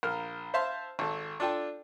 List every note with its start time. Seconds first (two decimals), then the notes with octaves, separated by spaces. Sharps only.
0.03 A#1 A#4 F6
0.54 C5 E5 F5 A5 C6
0.99 G#1 A4
1.40 D4 F4 A4 G5